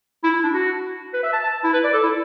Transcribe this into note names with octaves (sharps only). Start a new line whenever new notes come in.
E4
E4
D4
F#4
B4
E5
A5
A5
E4
B4
D5
A4
E4